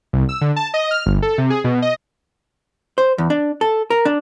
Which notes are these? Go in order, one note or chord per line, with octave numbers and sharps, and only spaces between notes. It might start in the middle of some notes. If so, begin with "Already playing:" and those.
C2
E6
D3
A5
D#5
F6
G1
A4
C3
G#4
B2
D#5
C5
E2
D4
A4
A#4
D4